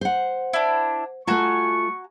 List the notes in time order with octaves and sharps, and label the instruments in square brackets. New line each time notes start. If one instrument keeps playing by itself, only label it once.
[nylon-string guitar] C5 F#5
[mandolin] D4 E4
[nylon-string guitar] A3 F4 [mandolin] F#4 G#5 A#5 [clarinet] C#6